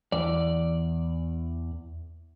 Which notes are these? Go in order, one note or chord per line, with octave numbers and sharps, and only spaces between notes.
E2 D5